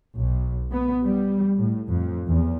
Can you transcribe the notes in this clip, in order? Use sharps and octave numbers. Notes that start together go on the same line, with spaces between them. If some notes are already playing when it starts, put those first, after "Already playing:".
B1
B3
G3
A2
F2
E2